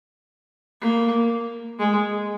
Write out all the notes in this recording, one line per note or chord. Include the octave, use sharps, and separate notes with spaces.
A#3
G#3